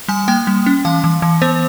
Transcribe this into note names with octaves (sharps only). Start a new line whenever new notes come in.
G3 G#5
A#3 G5
G3
C#4
E3 F5
E3
E3
B3 C5